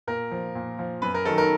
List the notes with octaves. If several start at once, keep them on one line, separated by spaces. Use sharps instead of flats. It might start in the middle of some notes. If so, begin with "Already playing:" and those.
A#2 A#4
F3
A#2
F3
F#2 B4
A#4
D#3 F#3 A4
A#4